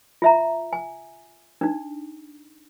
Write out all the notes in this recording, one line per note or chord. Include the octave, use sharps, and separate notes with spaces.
F4 E5 A#5
G#5
D4 D#4